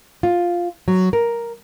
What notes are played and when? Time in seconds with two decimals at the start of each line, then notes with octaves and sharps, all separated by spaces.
0.23 F4
0.88 F#3
1.13 A#4